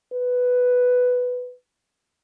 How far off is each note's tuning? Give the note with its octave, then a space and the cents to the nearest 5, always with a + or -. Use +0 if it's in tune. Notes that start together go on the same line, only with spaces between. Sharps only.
B4 +5